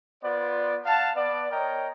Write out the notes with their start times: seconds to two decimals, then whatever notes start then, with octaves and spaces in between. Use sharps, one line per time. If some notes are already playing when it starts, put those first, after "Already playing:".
0.24 B3 F4 C5 D5
0.86 F5 F#5 A5
1.16 B3 D5
1.51 A#4 C#5 D#5 G5 A#5